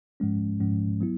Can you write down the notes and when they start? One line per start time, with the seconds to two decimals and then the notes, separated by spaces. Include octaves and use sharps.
0.20 G#2 F3 G#3 C#4
0.60 G#2 F3 G#3 C#4
1.01 F#3 B3 E4